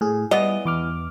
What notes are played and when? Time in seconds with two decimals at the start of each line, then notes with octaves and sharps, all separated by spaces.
0.01 A2 G#4
0.31 E3 G3 B3 D#5
0.65 E2 D6 F6